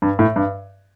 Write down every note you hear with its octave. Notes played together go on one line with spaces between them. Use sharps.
G2
A2
G2